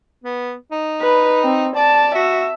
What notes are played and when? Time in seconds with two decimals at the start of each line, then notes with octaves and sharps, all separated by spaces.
0.24 B3
0.72 D#4
1.01 B4
1.43 C4
1.76 D5 A5
2.15 F#4 E5